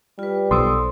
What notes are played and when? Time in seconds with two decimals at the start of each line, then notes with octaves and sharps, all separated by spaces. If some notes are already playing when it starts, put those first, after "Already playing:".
0.19 G3 F4 B4
0.51 B1 A4 C5 C6 D#6 E6